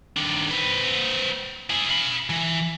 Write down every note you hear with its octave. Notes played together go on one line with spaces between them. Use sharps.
D#3 D4
C4 B4
E4 G#4
F5 B5
E3